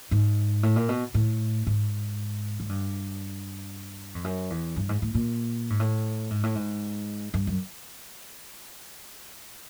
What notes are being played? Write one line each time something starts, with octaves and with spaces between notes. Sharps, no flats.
G#2
A2
A#2
B2
A2
G#2
G#2
G2
F2
F#2
E2
G2
G#2
A2
A#2
G#2
A2
G#2
A2
G#2
G2
F#2